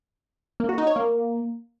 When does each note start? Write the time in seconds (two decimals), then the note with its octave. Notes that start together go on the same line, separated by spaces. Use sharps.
0.60 A#3
0.69 F#4
0.78 D#4
0.87 C#5
0.96 A#3